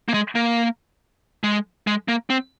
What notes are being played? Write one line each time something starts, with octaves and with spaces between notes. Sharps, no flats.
A#3
G#3
A#3
G#3
G#3
A#3
C4